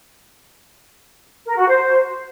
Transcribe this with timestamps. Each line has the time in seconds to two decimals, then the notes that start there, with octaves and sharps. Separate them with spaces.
1.46 A#4
1.57 F#4
1.67 C5